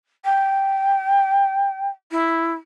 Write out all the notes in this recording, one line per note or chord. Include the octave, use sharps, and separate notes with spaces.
G5
E4